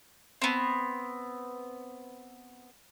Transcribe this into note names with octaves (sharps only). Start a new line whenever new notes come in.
B3 C4